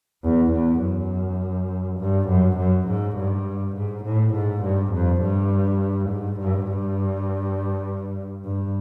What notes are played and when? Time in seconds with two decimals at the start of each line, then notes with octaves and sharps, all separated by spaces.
0.24 E2
0.53 E2
0.82 F#2
2.00 G2
2.29 F#2
2.58 F#2
2.88 G#2
3.17 G2
3.76 G#2
4.05 A2
4.34 G#2
4.64 G2
4.93 F2
5.22 G2
6.10 G#2
6.40 G2
6.69 G2
8.45 G2